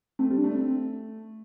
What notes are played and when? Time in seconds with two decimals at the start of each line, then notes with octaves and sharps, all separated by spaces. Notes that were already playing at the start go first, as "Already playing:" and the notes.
0.19 A3 C4
0.30 G3 C4
0.38 D4
0.44 A3
0.51 D4
0.55 C4